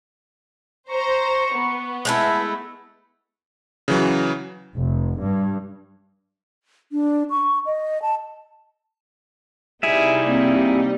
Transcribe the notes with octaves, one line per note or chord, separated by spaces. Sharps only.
C5 A#5 C#6
B3
G#3 A3 E4
C#3 E3 F#3
F1
G2
D4
C#6
D#5
A5
C3 G3 D#4 E4 G#4 E5
A#3 C4